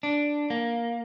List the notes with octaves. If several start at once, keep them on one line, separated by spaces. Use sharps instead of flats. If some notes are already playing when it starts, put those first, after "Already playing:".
D4
A#3